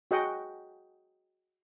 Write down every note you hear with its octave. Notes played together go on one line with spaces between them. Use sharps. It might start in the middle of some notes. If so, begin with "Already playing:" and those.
F#4 G#4 D#5 F#5 G5